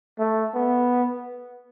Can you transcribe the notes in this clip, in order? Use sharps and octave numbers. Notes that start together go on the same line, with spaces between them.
A3
B3